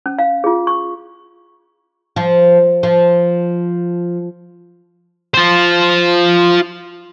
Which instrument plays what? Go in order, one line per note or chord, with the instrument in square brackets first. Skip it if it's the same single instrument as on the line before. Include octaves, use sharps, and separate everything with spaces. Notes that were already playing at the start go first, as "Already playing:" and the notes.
[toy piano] C#4
F5
F4 G#4
C#6
[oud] F3
F3
[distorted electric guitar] F4 C5